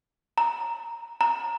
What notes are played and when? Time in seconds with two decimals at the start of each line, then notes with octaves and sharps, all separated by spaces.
0.38 A#5
1.21 A#5